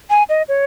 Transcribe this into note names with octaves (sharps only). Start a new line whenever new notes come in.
G#5
D#5
C#5